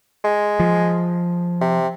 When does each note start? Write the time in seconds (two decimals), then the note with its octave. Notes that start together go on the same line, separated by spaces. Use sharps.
0.24 G#3
0.60 F3
1.61 C3